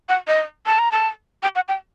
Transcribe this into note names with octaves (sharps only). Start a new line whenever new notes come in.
F#5
D#5
A5
A#5
A5
G5
F#5
G5